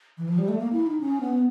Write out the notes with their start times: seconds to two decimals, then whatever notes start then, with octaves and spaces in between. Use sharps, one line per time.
0.18 E3
0.28 F3
0.38 G3
0.48 A3
0.59 A#3
0.73 E4
0.86 D#4
1.00 C#4
1.21 B3